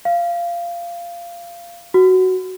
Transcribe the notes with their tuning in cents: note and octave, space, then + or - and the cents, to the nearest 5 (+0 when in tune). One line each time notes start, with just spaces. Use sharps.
F5 -15
F#4 +10